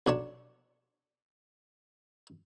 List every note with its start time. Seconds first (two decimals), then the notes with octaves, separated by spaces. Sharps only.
0.07 B1 D4 C#5 A5